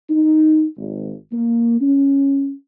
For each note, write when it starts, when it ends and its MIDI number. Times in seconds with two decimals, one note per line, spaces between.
0.10 0.65 63
0.77 1.13 32
1.32 1.77 58
1.81 2.52 61